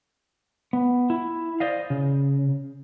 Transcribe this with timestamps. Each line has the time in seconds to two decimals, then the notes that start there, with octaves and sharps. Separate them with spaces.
0.73 B3
1.10 E4
1.60 C5 D5 D#5 F5
1.90 C#3